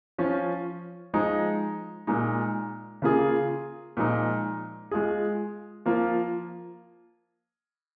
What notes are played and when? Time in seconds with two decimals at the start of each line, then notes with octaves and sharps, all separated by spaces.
0.18 F3 C#4 F4
1.14 F3 G#3 D#4 G#4
2.07 A#2 G#3 D#4
3.02 C#3 A#3 F4 G#4
3.97 A#2 F3 G#3 D#4
4.91 G#3 F4 G#4
5.86 F3 A#3 F4